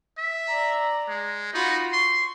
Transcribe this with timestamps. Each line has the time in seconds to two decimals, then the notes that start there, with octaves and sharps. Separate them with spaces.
0.18 E5
0.49 D5 A#5
1.08 G#3
1.53 D#4 F4 F#4 B5
1.93 C6 C#6